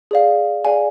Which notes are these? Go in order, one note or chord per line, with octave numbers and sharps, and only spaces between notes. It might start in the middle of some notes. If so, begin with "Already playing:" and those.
G#4 D5 F5
G#4 D5 F5 G#5